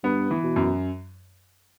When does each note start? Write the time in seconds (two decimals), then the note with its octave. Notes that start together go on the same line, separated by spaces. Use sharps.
0.04 G2 B3
0.31 E3
0.44 B2
0.56 F#2